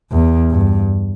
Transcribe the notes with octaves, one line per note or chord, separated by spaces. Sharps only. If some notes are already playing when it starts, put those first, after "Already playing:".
E2
G2